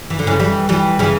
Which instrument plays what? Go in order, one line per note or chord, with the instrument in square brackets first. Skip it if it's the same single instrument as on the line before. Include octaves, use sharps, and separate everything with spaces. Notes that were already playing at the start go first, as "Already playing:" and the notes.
[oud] E3
D3
C#3 E3
E3 G3
E3 G3
C#3 E3